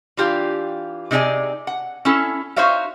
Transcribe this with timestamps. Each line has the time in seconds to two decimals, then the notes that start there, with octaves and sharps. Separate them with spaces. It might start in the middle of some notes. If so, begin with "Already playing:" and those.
0.17 E3 D4 F4 G4 F5
1.11 C3 D#4 G#4 D5 G#5
1.67 F#5
2.05 C#4 E4 A4
2.56 D#4 F#4 C5 C#5 E5 F5